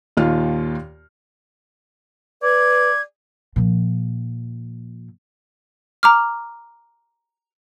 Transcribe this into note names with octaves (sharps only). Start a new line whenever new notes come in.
D#2 A#2 D#3 F4 F5 F6
B4 D5 G#6
A#2 F3
A#5 D6 F6